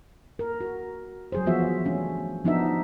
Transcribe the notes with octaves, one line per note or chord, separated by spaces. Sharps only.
A#4
F#4
F#3 G#4 C5
E3 F3 B3 F4 F#4 E5
A3 C#4 D4
F3 B3 D4 D#4 F#4 E5